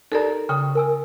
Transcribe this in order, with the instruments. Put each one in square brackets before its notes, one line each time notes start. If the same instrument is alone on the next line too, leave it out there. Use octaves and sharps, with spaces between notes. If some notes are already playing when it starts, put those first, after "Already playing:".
[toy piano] D#4 G4 A#5 [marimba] A4 A#4 D5
[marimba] C#3 [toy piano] G5 C#6 D#6
[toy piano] A#4 G#5 E6